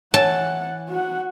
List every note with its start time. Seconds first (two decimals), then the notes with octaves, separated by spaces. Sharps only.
0.14 E3 C#5 F#5 A5
0.89 F#4 F#5